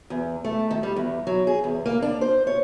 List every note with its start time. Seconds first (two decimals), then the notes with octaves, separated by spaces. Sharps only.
0.10 E2
0.44 A3
0.71 D#3
0.83 G3
0.96 E2
1.27 F#3
1.47 G#4
1.64 E2
1.86 A#3
2.02 D4
2.21 C5
2.47 C#5